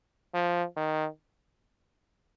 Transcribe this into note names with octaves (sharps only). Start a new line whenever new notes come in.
F3
D#3